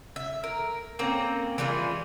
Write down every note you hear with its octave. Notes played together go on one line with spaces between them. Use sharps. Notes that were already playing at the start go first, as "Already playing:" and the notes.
E5
A#4
A#3 C4 C#4 A#5
E3 G3 G#3 F4